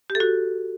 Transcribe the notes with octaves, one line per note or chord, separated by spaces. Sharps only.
G4
A4
F#4